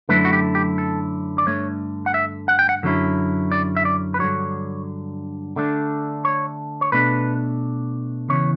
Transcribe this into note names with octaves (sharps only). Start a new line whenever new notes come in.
F#2 D3 F#3 A3 E4 B4
F#4
G4
G4
A4
D5
G2 D3 A3 C#5
F#5
E5
F#5
G5
F#5
F#2 D3 F#3 C#4 E4
D5
E5
D5
B4
G2 D3 F#3 C#5
D3 A3 D4
C#5
C#5
B2 A3 D4 B4
E2 C#3 E3 C#5